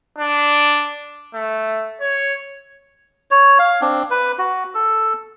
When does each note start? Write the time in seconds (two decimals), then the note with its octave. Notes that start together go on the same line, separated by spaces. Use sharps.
0.18 D4
1.34 A3
2.01 C#5
3.31 C#5
3.59 F5
3.81 C4 D4
4.11 B4
4.39 F#4
4.75 A4